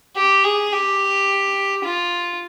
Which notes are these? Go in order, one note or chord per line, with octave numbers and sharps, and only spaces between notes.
G4
G#4
G4
F4